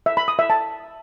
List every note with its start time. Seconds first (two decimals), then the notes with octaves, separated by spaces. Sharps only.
0.06 E5
0.17 B5
0.28 D#6
0.39 E5
0.50 A5